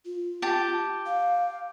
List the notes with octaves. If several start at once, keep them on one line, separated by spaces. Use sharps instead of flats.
F4
G4 A5
F5